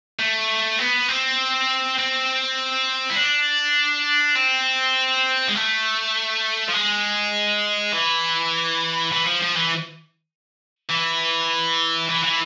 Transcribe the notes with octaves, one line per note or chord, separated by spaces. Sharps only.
A3
B3
C4
C4
E4
D4
C4
G#3
A3
F3
G#3
E3
E3
F3
F3
E3
E3
E3
E3